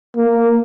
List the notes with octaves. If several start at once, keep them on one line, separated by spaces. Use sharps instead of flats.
A#3